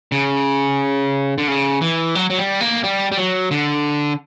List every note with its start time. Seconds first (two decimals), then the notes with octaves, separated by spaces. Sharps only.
0.12 C#3
1.38 D3
1.48 C#3
1.81 E3
2.15 F#3
2.30 F#3
2.38 G3
2.61 A#3
2.84 G3
3.12 G3
3.17 F#3
3.51 D3